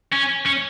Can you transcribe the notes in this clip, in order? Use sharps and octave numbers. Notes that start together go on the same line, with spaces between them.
C#4
C#4